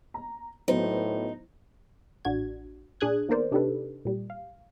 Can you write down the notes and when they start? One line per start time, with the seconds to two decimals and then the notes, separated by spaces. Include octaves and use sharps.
0.14 A#5
0.68 A2 F#3 B3 D#4 C5
2.25 A1 D4 F#4 G#6
3.00 A#2 D4 G#4 D#6 F#6 G#6
3.29 D#3 A#3 B3 A#4 C5 D5
3.51 C3 D4 D#4 G4 A4 B4
4.05 A#2 G3
4.30 F5